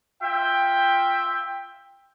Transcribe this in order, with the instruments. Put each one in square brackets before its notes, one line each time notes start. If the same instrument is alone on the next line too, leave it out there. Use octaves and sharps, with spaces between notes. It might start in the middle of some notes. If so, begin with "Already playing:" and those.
[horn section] F4 E5 G5